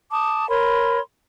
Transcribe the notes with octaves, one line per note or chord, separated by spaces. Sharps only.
A5 D6 D#6
A#4 C#5 B5 C6